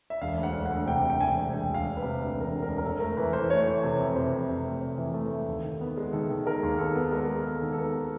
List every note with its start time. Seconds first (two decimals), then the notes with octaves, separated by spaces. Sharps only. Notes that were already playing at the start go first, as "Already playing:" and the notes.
0.10 E5
0.21 E1 F5
0.38 D2
0.43 F#5
0.54 D2
0.66 F#5
0.71 D2
0.87 C3 G5
1.04 C3
1.10 G5
1.20 E1 G#5
1.37 C3
1.53 E1 G5
1.69 E1
1.74 F5
1.85 E1
1.97 B4
2.02 C3
2.19 D2
2.36 E1 A#4
2.51 D2
2.62 A#4
2.68 E1
2.78 A#4
2.84 F2 A4
3.00 A3 A#4
3.17 E3 B4
3.33 E3 C5
3.50 A3 C#5
3.67 E3
3.83 C3
3.99 F2
4.16 C3 C5
4.32 F2
4.49 C3
4.65 A3
4.81 C3
4.98 E3
5.14 A3
5.31 A3
5.48 D#2
5.63 D#3
5.81 B3
5.97 G#3
6.13 D#3 A4
6.30 D#3
6.46 G#3 A#4
6.63 D#2
6.78 D#2 A4
6.95 B3
7.11 G#3 A#4
7.28 G#3
7.45 B3 A4
7.62 D#3
7.73 A4
7.78 B3 A#4
7.95 G#3